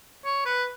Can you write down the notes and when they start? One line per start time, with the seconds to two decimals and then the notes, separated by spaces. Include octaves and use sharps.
0.25 C#5
0.46 B4